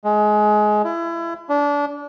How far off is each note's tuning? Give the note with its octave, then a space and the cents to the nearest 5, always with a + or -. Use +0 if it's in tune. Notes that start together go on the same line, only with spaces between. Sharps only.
G#3 +20
E4 +30
D4 -25